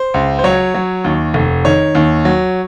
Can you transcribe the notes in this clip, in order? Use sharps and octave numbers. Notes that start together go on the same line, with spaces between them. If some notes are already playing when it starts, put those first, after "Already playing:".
Already playing: C5
C#2
C5
F#3 C#5
F#3
D#2
F1
D#3 C#5
D#2
F#3